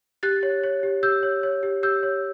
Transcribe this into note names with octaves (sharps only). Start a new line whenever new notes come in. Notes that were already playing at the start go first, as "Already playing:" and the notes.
G4 F#6 A6
C#5
C#5
G4
G4 E6 G6
C#5
C#5
G4
G4 E6 G6
C#5